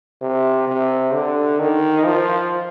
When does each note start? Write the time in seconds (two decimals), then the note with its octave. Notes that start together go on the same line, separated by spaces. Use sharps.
0.22 C3
0.68 C3
1.14 D3
1.59 D#3
2.06 F3